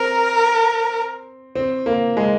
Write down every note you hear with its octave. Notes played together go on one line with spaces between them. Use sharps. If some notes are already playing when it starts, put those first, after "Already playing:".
Already playing: C4 A#4
C4
A#3
G#3